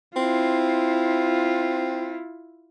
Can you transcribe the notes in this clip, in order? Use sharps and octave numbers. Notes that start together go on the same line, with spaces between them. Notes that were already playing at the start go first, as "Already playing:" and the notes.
C4 E4 F4